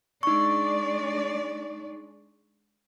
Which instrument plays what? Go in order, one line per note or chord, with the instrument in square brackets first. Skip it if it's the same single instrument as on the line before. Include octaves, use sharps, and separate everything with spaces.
[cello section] G#3 D4 D5 [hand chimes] D#4 C#6